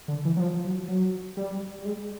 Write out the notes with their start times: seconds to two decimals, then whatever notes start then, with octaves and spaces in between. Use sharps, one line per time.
0.08 D3
0.25 E3
0.37 F#3
0.40 F3
0.65 F#3
0.88 F#3
1.37 G3
1.79 G3
1.85 G#3